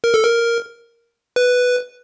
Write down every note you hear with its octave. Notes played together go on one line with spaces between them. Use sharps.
A#4
A4
A#4
B4